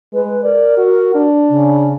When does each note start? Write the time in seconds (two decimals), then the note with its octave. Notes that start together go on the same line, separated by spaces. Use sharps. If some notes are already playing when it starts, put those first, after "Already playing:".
0.13 G#3 B4
0.44 A#4 D5
0.77 F#4
1.15 D4
1.49 C#3